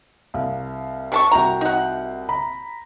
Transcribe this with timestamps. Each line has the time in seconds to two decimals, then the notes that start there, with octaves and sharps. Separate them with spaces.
0.34 C2 F5
1.12 C3 A5 C#6
1.31 C2 F#4 G5 A#5
1.61 D#4 F#5
2.29 A#5 B5